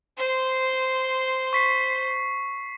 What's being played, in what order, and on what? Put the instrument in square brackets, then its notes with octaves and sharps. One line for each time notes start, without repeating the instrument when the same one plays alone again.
[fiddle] C5 C6
[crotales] C#6 B6 C7